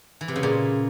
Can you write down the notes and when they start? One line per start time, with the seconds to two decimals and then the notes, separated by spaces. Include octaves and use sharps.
0.21 E3
0.28 C3
0.36 C#3
0.43 A#2